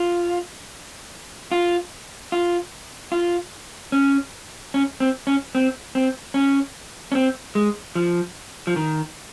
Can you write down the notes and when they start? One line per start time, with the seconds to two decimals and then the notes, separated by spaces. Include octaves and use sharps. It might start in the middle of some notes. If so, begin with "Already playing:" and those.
Already playing: F4
1.52 F4
2.32 F4
3.12 F4
3.92 C#4
4.74 C#4
5.00 C4
5.27 C#4
5.55 C4
5.95 C4
6.34 C#4
7.12 C#4
7.15 C4
7.55 G#3
7.95 F3
8.67 F3
8.76 D#3